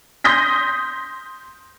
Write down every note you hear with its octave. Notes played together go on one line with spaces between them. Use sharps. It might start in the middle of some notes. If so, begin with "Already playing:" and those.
C6 D#6 G6 A#6 B6